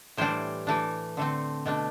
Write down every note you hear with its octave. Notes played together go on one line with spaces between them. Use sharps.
A2 E3 G3 D4 C5
E3 A3 D4
D3 A3 C4
B2 A3 D4